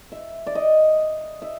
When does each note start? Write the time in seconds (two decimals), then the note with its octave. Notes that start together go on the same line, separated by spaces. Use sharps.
0.12 E5
0.47 D5
0.55 D#5
1.42 E5